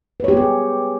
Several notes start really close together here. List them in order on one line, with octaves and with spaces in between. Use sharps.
B4 C#5 G4 B3 G#4